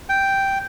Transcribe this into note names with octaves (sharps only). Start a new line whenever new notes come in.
G5